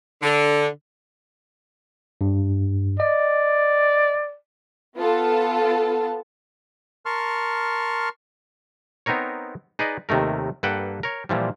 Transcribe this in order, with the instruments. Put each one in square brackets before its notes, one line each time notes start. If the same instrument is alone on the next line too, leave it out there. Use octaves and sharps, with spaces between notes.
[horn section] D3
[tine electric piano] G2
[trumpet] D5 [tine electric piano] D#5
[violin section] B3 F4 A4 A5
[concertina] A#4 A5 C6 C#6 F6
[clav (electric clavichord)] B3 C4 D#4 A#4 C#5
D#4 G#4 B4 D5 D#5
D#2 C3 D#3 A3 A#4
G2 A#3 A4 B4 F#5 G5
A#4 C#5
A#2 E3 F3 G3